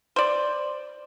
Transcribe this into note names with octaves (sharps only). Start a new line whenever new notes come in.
C5 D5